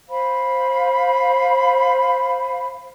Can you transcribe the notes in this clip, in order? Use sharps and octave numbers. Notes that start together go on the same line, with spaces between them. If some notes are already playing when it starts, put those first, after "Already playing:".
C5 F5 B5